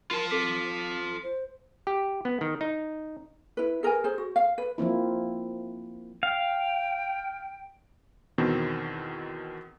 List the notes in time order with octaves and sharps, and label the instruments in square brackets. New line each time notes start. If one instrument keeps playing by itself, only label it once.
[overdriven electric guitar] F4 A5 [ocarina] A#4
[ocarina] C4 [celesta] A4 D6 B6
[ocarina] C5
[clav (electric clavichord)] G4
B3
D#3
D#4
[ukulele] E4 B4
G#4 A#4 B4 G#5
G#4 C5
F#4
F5
B4
[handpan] F3 A#3 C4 E4
[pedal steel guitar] F5 [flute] G5
[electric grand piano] E2 B2 D#3 C4